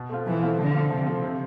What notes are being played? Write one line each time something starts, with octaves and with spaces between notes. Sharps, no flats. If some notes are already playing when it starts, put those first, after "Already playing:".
Already playing: B2
A3 C4 F4
B2 E3
A3 C4 F4
D3 F3
A3 C4 F4
C3 F3
A3 C4 F4
C3